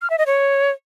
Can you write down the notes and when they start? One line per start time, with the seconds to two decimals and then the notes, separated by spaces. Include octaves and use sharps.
0.02 F6
0.10 E5
0.18 D#5
0.26 C#5